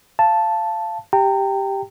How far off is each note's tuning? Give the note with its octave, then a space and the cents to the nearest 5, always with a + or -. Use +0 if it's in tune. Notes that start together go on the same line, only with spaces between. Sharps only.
F5 -20 A5 +0
G4 +0 G5 +0 A#5 -35